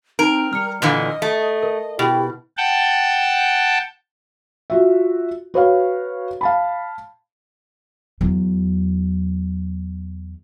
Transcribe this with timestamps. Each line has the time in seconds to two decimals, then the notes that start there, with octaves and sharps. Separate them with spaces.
0.19 C4 D#4 A#4 D7
0.53 G3 F6 C#7
0.82 A#2 D3 E3 D#5
1.22 A3
1.63 A#4
1.99 B2 E4 G4
2.57 F#5 G5 A5
4.70 F4 F#4 E5
5.54 F#4 B4 C#5 F5
6.41 F5 A5 B5
8.21 E2 F#3